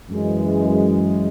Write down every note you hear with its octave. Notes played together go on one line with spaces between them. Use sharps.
F#2 E3 G#3